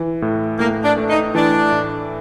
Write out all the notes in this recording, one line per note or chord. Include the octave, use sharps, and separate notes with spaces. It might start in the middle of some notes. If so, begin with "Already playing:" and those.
Already playing: E3
A2
A2 A#3
D4
A3
D#4
E3 D4
A2